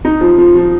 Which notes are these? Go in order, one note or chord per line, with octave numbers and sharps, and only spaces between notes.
D#4
F3
F3
F3